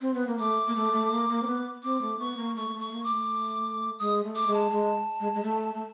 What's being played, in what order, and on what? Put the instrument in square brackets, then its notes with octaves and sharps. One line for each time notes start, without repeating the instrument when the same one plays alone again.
[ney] C4
B3
A#3
[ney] A3 [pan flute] D6
[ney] A#3
A3
A3
A#3
A#3
C4
B3
[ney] C4 [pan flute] D6
[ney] A3
[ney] B3 [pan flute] C#6
[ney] A#3
[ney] A3 [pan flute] C#6
[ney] A#3
A3
[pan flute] C#6
[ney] A#3
[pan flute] D6
[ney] A3
[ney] G#3 [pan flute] D#6
[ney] A3
[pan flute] D6
[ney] G#3
[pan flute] A5
[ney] G#3
G#3
G#3
A3
A3